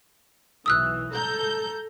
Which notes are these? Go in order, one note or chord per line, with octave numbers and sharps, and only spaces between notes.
B1 E3 D#6 E6 F#6
A4 A#5 G6